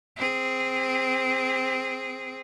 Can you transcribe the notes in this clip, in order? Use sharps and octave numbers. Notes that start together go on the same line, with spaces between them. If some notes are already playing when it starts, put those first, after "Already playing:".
C4 G#4